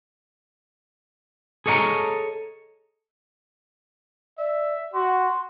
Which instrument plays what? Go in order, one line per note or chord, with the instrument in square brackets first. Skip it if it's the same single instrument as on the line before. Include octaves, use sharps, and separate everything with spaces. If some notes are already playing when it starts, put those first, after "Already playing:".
[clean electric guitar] G#4 A4 C#5 D#5 F#5 A#5
[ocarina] D5 [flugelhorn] E5
[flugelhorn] F#4 [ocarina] C6